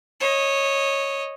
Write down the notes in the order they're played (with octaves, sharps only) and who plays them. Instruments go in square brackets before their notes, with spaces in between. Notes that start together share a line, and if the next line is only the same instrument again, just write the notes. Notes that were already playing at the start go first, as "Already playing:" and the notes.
[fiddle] C#5 D#5